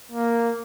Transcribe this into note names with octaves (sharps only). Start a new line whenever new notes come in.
A#3